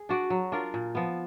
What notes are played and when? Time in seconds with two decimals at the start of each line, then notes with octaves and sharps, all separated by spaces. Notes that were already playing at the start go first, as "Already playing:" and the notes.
Already playing: G#4
0.09 D4 F#4 D5
0.30 F#3
0.52 D4 F4 A#4
0.74 A#2
0.95 F3 B3